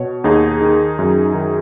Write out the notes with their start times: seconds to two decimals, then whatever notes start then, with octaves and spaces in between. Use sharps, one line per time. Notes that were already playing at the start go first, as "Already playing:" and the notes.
Already playing: B2 C#5
0.24 D#2 D#4 G#4
0.61 D#3
0.99 F#2
1.34 D#3